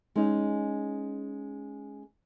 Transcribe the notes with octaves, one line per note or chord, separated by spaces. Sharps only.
G#3 C#4 D#4